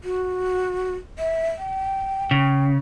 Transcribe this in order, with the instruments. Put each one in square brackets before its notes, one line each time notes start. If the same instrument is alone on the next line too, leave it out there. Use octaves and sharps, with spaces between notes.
[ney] F#4
E5
G5
[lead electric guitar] C#3